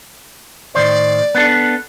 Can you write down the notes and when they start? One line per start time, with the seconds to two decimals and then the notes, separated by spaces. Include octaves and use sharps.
0.75 A2 D#3 C5 D5
1.35 B3 D4 A4